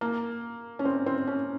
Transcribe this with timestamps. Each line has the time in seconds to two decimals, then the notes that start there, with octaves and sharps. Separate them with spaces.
0.01 A#3
0.79 C#4
0.85 C4
1.06 C4
1.27 C#4